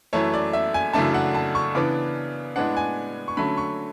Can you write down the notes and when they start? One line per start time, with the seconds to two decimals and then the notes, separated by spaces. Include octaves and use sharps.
0.13 F#2 E3 A3 C#5
0.34 D5
0.53 E5
0.74 G#5
0.93 F#2 C#3 E3 A3 D4 A5
1.14 F#5
1.35 A5
1.55 C#6
1.75 C#3 E3 B3 D4 D6
2.56 A2 G#3 B3 D4 F#5
2.77 G#5
3.28 C#6
3.37 D3 F#3 A3 C#4 B5
3.57 C#6